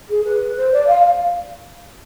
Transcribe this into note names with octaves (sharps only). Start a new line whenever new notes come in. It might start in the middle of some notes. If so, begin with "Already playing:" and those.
G#4
B4
C5
D5
F5